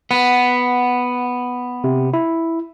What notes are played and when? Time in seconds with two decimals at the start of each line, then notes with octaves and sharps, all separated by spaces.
0.11 B3 F#5
1.84 C3
2.14 E4